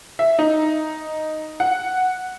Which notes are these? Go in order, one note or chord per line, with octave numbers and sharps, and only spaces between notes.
E5
D#4
F#5